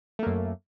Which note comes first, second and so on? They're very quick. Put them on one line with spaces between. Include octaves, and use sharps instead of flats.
A3 A#3 F#2